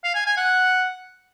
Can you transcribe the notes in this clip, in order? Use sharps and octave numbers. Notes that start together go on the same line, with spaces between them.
F5
G#5
G#5
F#5